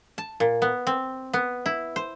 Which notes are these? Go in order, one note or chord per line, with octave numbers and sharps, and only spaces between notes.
A5
A#2
B3
C4
B3
E4
C5